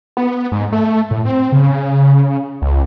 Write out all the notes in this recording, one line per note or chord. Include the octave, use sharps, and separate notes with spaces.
B3
G#2
A3
A2
C4
C#3
C#2